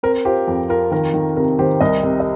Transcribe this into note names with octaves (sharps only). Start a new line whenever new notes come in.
C4 A#4
F4 G4 C5
F2
F4 A#4
D#3 A#4
D#3
C3 A#4
D#3 G4 C5
C2 A#4 D#5
C3
D#5